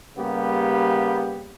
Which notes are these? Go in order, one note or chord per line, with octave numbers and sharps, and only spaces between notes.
C#3 G3 A#3 B3 G4